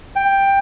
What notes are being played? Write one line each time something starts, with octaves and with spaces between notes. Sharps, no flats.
G5